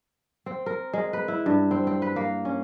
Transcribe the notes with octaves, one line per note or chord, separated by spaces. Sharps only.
C4
A#4
G#3
B4
E4
G2
C4
C4
B4
A#3
C#4